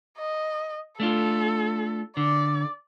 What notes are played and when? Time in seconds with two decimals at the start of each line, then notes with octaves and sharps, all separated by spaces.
0.18 D#5
1.00 A3 D4 F4 A4
2.17 D3 D5